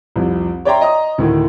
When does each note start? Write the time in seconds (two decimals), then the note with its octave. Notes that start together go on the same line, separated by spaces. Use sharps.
0.16 C2 F2 C3
0.65 C#5 D5 E5 G5 A#5 C6
0.81 D#5 A#5 D#6
1.18 D2 A2 D#3